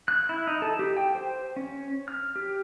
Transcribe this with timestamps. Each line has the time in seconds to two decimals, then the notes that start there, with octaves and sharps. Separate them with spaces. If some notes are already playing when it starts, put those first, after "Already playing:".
0.08 F#6
0.29 E4
0.47 D#4
0.62 A4
0.79 G4
0.97 G5
1.15 C5
1.56 C#4
2.08 F6
2.36 G4